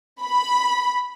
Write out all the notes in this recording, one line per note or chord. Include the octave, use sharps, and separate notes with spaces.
B5